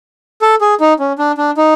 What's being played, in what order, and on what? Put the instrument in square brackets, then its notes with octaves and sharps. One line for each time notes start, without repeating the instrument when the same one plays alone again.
[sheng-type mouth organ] A4
G#4
D#4
C#4
D4
D4
D#4